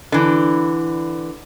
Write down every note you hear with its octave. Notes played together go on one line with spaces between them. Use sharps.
D3 E3